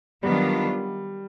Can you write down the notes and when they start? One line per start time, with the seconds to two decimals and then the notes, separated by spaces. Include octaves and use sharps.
0.23 D#3 F#3 G3 B3 D4 F4